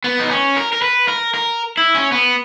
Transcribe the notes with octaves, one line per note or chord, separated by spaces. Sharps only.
B3
D#4
C#4
A#4
A#4
B4
A#4
A#4
E4
C#4
B3